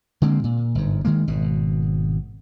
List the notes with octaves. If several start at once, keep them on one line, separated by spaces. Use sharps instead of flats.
D3 G#3 A#3 C4
A#2
G1 G#2
D#3 G#3 A#3
G#1 B2